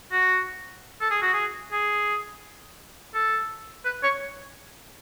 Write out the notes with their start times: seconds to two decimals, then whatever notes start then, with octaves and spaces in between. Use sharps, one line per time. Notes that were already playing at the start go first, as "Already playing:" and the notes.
0.12 F#4
1.01 A4
1.11 G#4
1.22 F#4
1.33 G#4
1.72 G#4
3.14 A4
3.85 B4
4.03 C#5